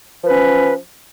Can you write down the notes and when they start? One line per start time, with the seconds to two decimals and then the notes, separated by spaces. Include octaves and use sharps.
0.23 F3
0.26 B4
0.30 C#4